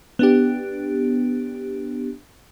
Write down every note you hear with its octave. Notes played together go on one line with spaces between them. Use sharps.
B3 D4 G4